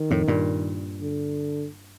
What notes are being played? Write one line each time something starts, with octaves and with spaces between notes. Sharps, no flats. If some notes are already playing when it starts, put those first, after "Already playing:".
Already playing: D#3
F2 A2
G2 A#2
D3